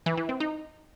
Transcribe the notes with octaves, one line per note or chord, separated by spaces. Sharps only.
E3
E3
C4
D#4